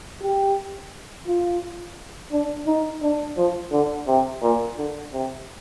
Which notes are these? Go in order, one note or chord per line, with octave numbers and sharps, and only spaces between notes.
G4
F4
D4
D#4
D4
F3
D3
C3
A#2
D3
C3